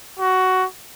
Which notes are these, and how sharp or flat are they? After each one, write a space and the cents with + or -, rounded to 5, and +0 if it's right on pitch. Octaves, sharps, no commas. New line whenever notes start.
F#4 +10